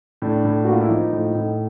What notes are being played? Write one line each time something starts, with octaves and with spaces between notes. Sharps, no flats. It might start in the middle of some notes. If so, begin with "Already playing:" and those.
A2 D4
A2
A#3 F#4
F4
E4
F3 D#4
A2
A2